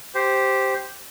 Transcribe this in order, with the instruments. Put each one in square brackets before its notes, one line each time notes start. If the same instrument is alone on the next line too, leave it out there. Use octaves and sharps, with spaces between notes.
[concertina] G4 C5